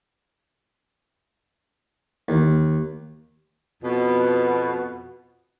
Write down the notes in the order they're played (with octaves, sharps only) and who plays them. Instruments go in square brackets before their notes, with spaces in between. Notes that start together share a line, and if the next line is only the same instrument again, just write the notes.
[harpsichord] D#2
[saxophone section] F2 B2